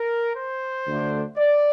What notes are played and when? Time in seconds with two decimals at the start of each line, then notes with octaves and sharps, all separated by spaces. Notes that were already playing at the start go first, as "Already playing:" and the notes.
Already playing: A#4
0.36 C5
0.87 D2 D3 A3 D4
1.37 D5